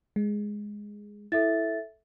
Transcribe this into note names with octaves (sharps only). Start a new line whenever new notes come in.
G#3
E4 A4 E5 A6